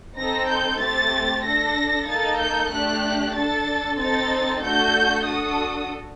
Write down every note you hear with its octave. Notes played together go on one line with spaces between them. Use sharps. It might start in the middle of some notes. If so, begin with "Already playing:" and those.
C4 D#4 A4 A#6
G6
A3 C4 G4 A6
D4 A4 A#6
A#3 D#4 A4 A6
G6
A3 D4 G4 F#6
D4 A4 A6
C4 D#4 A4 A6
A3 D4 F#4 A4 G6
D4 F#4 A4 D#6